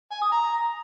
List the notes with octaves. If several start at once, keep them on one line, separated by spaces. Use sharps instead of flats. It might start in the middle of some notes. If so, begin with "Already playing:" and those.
G#5
D#6
A#5